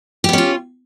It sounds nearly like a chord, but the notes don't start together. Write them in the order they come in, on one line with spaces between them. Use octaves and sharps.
G4 B3 C#4 F4